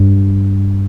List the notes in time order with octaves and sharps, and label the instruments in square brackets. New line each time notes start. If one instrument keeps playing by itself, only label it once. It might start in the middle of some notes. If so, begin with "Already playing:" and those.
Already playing: [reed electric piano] G2